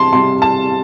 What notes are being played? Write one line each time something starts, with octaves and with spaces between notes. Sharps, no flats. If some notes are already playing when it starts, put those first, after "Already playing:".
Already playing: C3 G3 A5 C6
C3 G3 C6
A5